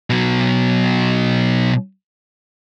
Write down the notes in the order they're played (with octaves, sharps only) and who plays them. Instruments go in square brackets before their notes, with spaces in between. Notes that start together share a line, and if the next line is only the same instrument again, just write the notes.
[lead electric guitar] B2 F#3